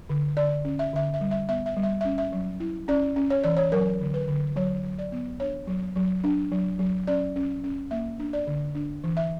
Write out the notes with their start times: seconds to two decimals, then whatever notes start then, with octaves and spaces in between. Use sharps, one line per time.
0.10 D3
0.37 D3 D5
0.65 C#4
0.79 E5
0.93 D3 E5
1.14 E5
1.21 G3
1.31 E5
1.49 B3 E5
1.66 E5
1.76 G3
1.83 E5
2.01 E5
2.05 C#4
2.18 E5
2.32 F#3
2.60 E4
2.88 C#4 D5
3.16 C#4
3.30 C#5
3.44 E3 D5
3.57 C#5
3.72 F#3 A#4
4.01 D3
4.14 B4
4.28 D3
4.56 F#3 C#5
4.84 F#3
4.98 D5
5.12 B3
5.40 D4 C#5
5.67 F#3
5.96 F#3
6.24 D4
6.52 F#3
6.79 F#3
7.07 C#4 D5
7.36 C#4
7.64 C#4
7.91 A#3 E5
8.19 D4
8.33 D5
8.47 D3
8.75 D4
9.04 E3
9.17 E5